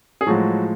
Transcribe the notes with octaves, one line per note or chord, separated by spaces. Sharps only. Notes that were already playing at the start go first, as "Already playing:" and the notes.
G#4
A2 F3 F#3 G#3 F#4